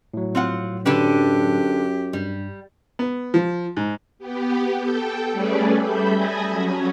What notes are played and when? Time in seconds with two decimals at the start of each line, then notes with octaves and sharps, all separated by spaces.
0.14 A2 F#3
0.35 C4 F4 F#5
0.86 F#2 D3 D4 G4 B4
2.13 G2 G3
2.99 B3
3.34 F3
3.77 G#2
4.19 B3 G4
4.81 A4 G5
5.32 G3 A3 C#4 G#4 B4 D5
5.77 G3 A4 E5 B5 G6
6.13 G#5 A5 B5 D#6 G#6 A#6
6.50 F#3 C#4